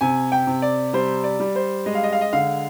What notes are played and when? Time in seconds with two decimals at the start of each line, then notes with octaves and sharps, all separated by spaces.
0.01 C3 G#5
0.32 G5
0.47 C3
0.62 D5
0.93 G3 C5
1.24 D5
1.40 G3
1.56 C5
1.86 G#3 D#5
1.95 F5
2.03 D#5
2.12 F5
2.21 D#5
2.33 D3 F5